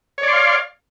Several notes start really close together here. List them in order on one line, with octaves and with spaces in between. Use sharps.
C#5 D5 C6 F5